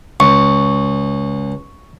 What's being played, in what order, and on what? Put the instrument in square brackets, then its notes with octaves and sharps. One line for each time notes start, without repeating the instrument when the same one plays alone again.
[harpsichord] C#2 [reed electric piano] C#6